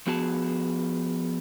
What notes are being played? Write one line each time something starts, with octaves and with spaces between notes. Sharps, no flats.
F3 B3 F#4 G#4 A5